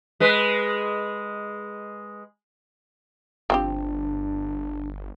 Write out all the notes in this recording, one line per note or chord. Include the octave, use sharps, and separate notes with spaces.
G#3 B4
G1 F3 C4 D4 G4